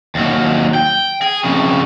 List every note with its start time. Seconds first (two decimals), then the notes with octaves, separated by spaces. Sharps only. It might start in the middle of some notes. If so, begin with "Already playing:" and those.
0.15 D#2 F#3
0.75 G5
1.22 G#4
1.44 F2 C#3